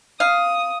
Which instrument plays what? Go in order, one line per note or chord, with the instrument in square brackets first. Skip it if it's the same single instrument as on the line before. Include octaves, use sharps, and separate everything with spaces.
[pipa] F5 [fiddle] D#6